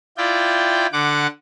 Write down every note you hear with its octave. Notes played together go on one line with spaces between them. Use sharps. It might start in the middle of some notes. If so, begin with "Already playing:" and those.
E4 F4 D5 G5
D3 F#5 D6